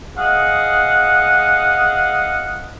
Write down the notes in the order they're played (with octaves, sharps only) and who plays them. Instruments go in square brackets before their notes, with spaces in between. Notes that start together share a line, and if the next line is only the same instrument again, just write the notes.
[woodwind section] G#4 D#5 F5 F#5